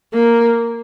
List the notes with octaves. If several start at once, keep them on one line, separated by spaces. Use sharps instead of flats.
A#3